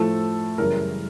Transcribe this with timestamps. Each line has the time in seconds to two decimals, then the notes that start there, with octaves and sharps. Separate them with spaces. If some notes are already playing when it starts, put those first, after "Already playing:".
Already playing: A2 F3 A3 A4
0.58 F#2 C#3 E3 G3 A#4